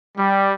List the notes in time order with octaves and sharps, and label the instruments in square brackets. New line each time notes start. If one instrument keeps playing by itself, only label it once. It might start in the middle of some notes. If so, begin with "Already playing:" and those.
[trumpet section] G3